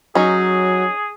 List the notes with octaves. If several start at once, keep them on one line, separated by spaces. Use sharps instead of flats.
F#3 C#4 D#4 G#4